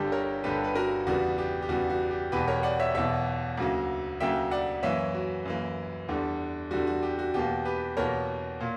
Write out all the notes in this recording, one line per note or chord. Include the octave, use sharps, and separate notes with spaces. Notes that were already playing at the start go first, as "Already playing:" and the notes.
Already playing: G1 G2 D3 G3 G4
A#4 C#5
G1 G2 D3 G3 G4 B4
B4
F#4 A#4
E2 C#3 G3 B3 F#4
G4
G4
E2 C#3 G3 B3 F#4
F#4
G4
E1 E2 B2 G4 B4
A#4 C#5
D5 F#5
C#5 E5
E1 E2 B2 C#5 E5
D2 C#3 F#3 A#3
D2 C#3 F#3 A#3 E5 G5
D5 F#5
F#2 E3 A#3 C#5 E5
F#4
F#2 E3 A#3
E2 D3 G3
E2 D3 G3 F#4
F#4
G4
F#4
E2 B2 A#3 G4
G4 B4
E2 B2 A#3 A#4 C#5
A#2 A#3